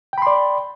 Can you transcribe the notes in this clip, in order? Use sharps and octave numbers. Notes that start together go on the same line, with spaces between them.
D5 G5 B5 C6